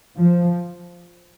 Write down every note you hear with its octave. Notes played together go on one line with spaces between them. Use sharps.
F3